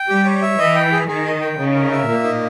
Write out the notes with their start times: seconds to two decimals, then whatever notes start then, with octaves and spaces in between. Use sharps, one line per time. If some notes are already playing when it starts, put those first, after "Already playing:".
Already playing: G5
0.09 G3 G4
0.25 C#5
0.42 E5
0.58 E3 D#5
0.75 G5
0.92 G#4
1.08 D#3 G#4
1.25 D#5
1.41 G5
1.57 C#3 D#4
1.75 A#4
1.91 E5
2.08 A#2 A#3
2.24 D#4